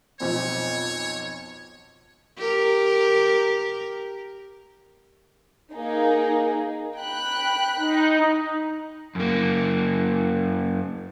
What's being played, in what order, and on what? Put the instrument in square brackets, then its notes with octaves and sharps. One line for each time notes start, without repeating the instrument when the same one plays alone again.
[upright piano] B1 F2 C4 [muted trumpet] C#5
[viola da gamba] G4 A#4
[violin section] A#3 D#4 G#4
G5 B5 F#6
[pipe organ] D#4
[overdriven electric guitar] F#2 A#3